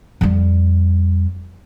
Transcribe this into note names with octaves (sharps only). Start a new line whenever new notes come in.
F2 G3